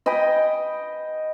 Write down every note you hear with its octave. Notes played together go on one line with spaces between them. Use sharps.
D#5 G5 G#5 B5